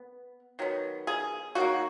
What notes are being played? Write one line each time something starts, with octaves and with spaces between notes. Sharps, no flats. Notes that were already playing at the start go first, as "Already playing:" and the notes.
Already playing: B3
D#3 F#3 B3
G#4
D#3 F#3 A#3 F#4